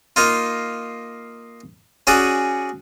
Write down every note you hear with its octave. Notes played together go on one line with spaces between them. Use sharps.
A#3 D#4 F4
C#4 F#4 G#4 D5 F#5